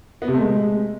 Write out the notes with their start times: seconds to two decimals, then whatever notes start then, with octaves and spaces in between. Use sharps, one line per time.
0.22 B3
0.28 C3
0.34 A3
0.40 G#3